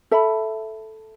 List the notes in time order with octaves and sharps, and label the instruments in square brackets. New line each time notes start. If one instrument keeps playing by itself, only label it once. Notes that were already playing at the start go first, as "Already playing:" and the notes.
[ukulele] A4 E5 B5